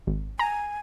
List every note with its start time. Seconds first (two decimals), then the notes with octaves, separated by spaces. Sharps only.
0.07 G#1
0.39 G#5 A#5